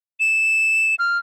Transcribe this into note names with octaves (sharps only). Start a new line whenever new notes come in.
E7
F6